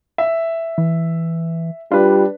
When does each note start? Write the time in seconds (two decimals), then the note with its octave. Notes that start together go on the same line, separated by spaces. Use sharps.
0.18 E5
0.78 E3
1.91 G3 D4 F4 B4